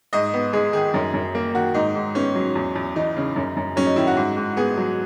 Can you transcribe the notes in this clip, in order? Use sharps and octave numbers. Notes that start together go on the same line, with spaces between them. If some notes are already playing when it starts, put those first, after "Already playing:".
G#2 D#5
B3
G#3 G#4
D#3 G#4
F#2
F#2
A#3
D#3 F#4
G#2 D#4
G#2
B3 C#4
F#3
E2
E2
E3 D#4
C#3
F#2
F#2
F#3 C#4
D#4
D#3 E4
F#4
G#2
G#2
B3 G#4
F#3